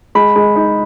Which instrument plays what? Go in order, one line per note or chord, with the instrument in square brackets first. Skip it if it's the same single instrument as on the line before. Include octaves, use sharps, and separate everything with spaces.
[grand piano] G#3 [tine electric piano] B5
[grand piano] G#3
D#4